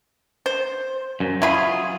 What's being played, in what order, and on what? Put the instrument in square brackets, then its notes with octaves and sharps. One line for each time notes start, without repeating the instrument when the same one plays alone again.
[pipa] C5
[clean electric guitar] F#2
[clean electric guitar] F#3 F4 G#4 [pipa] E4 B5